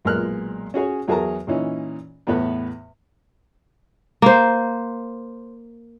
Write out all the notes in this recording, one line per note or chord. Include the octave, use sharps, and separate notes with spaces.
B1 A#2 G#3 A#4 F6 F#6
C#4 F#4 G#4 C#5
E2 F#3 G#4 A#4 A5 A#5
A#2 E3 C#4 D#4
E2 A2 B3 B4
A#3 C5